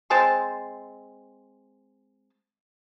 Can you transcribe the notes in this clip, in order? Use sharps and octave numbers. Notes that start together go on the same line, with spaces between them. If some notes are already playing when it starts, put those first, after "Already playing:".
G#3 C4 A5 C6